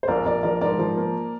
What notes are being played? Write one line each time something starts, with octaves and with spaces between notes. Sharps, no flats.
C5
A#1 A#4 D5
A#1 A#4 D5
F3 A#4 D5
G#2 A#4 D5
F3
A#3